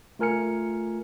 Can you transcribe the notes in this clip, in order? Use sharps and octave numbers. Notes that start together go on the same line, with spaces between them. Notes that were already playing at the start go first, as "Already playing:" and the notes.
A3 F4 A#4 G#5 F6 C#7